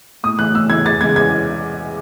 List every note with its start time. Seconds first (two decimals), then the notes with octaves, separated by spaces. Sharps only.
0.24 A2 D#6
0.39 E3 A3 F#6
0.55 A2 E6
0.70 E3 A3 G#6
0.85 E2 A6
1.01 C#3 E3 G#3 G#6
1.16 E2 G#6